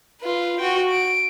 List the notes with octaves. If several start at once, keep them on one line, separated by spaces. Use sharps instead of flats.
F4 B4
F#4 G5
D7